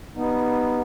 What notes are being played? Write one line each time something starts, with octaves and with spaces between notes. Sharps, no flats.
G3 B3 D#4